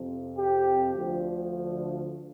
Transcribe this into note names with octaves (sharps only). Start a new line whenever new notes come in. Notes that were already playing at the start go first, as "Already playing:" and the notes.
Already playing: F2 C3 F3
G4
D2 D3 F3